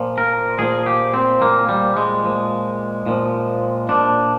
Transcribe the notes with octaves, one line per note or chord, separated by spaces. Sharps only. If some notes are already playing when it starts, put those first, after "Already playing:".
Already playing: A#2 F3
A#4
A#2 F3 G#4
G4
C4
A#2 F3 A#3
G3
G#3
A#2 F3
A#2 F3
A#2 F3 D4